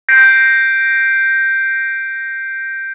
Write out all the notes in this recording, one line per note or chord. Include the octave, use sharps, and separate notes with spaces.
G6 A#6 C7 D7